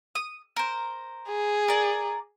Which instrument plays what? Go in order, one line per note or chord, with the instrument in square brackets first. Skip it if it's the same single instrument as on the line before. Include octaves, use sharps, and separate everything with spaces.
[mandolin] D#6
A#4 C5
[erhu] G#4
[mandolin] A#4 D5